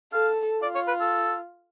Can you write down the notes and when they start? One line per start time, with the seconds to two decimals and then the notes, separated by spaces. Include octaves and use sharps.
0.12 A4 F5
0.62 F4 D5
0.75 C#5
0.88 B4
1.01 A4